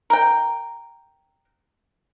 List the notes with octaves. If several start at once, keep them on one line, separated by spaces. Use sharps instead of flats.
A#4 G5